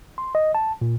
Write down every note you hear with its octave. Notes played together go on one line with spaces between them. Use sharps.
C6
D#5
A5
A#2